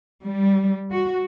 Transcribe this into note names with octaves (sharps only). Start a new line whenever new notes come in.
G3
F#4